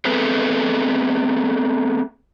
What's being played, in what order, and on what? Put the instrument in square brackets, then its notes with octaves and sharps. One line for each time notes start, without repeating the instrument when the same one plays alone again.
[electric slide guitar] A3 B3 C4 G#4 A4 B4